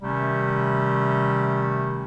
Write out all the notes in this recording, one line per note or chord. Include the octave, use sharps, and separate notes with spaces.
C3 D#3 G3 A3 C#4